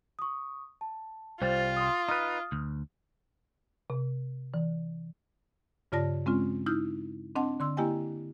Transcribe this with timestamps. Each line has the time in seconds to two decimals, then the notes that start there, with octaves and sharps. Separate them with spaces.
0.19 C#6 D#6
0.81 A5
1.42 C2 G3 F4 C5 A6
1.77 C6 D#6
2.09 D#4 B4 D#6 F6
2.52 D2
3.90 C3
4.54 E3
5.92 G2 C#3 F4 D5 A5 A#6
6.26 G#3 C4 C#4 F4
6.66 D#4 E4 F6 G6
7.36 C4 D4 D#5 F#5 A5
7.60 D3 C6 E6
7.77 A#3 E4 G4 D#5 G5 G#5